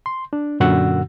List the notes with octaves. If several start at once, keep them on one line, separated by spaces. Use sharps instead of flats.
C6
D4
F#2 A#2 D3 F#4 F#5 E6